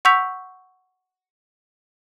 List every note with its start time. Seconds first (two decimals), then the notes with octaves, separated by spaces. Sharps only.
0.05 F#5 C#6 E6 G6 B6 F7